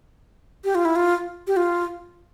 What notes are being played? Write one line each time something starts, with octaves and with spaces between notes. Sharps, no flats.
G4
F4
E4
F4
G4
F4